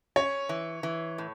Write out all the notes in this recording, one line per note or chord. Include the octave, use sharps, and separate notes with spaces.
C#4 C#5
E3
E3
A2